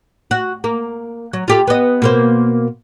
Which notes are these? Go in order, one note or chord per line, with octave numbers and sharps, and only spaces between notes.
F#4
A#3
F#3
F4 G4 A4
B3 D#5
B2 A#3 C5